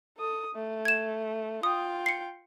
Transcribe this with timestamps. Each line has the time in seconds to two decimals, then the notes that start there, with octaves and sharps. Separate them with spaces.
0.17 A4 D#6
0.54 A3
0.85 G#6 E7
1.63 F4 G5 D#6
2.06 C7 C#7